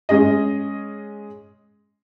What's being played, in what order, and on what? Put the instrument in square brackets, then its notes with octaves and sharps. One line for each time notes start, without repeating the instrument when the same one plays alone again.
[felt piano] G#3 C#4 G#4 D#5